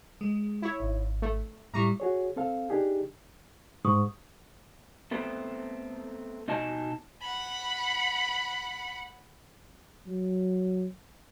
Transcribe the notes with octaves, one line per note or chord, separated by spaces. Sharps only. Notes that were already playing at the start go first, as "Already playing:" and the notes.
G#3
E4 C#5
G#1
A3
A2 G3 E4 A#5 C#6
F#4 G#4 C#5
C4 A4 F5
D4 D#4 G4 G#4
G#2 C#6 D#6
A3 B3 C4 A4
B2 D#4 D#5 G#5 A5
F#5 B5
F#3